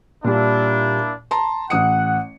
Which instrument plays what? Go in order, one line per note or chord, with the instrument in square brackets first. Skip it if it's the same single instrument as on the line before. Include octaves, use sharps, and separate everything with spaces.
[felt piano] A#2 G3 [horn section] A#3 D4 E4
[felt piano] A5 A#5 C6
[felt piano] A1 D#6 C#7 [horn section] F#5